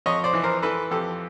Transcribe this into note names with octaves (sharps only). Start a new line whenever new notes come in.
F2 C#5 D#5
C5 D5
E3
A#4 C5
E3 A4 B4
F2 G4 A4